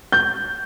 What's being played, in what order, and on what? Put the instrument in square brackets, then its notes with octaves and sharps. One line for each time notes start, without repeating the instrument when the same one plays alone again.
[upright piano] G6